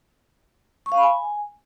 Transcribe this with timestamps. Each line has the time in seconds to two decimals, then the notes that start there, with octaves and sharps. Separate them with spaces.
0.86 C#6
0.92 F5
0.97 B5
1.03 G#5